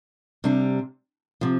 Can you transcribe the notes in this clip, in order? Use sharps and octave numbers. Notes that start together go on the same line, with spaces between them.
C3 G3 D4
C3 F3